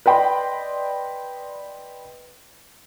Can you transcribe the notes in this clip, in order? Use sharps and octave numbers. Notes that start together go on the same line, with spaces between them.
B4 D5 D#5 G5 B5 C6